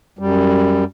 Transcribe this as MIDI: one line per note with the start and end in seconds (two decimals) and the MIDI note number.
0.19 0.84 42
0.19 0.84 55